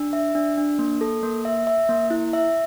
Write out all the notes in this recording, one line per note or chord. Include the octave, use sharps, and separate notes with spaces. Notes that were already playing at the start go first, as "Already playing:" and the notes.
Already playing: D4
E5
D4
D4
A#3
A4
A#3
E5
E5
A#3
E4
E5